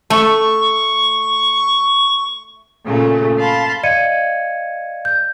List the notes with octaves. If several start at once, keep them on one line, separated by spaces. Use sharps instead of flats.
A3 C#6
A#2 C#3 A3
F5 A5 B5 C6
D5 D#5 F5 G#6 C#7 D#7
G6